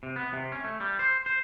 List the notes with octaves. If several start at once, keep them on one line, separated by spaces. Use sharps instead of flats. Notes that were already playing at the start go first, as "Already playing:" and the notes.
C3
B3
C3
C#4
A3
G3
C5
C5